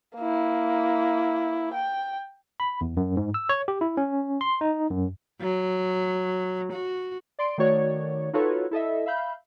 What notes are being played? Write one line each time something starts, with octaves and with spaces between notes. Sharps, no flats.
A#3 E4
G5
B5
E2
F#2
G#2
E6
C#5
G4
E4
C#4
C6
D#4
F#2
F#3
F#4
D5 C6 D7
D#3 A3 F#4 C#5 D5
D#4 F4 F#4 A4 B4 C#5
E4 A4 D#5 E5
E5 F5 B5 G6